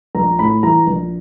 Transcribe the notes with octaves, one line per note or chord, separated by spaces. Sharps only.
A#1 A#5
A2 B5
E3 A#5
A#1